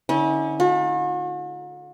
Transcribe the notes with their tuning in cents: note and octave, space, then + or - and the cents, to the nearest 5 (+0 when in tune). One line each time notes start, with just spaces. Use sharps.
D3 +0 C#4 +0 E4 -40
A3 -35 F#4 -45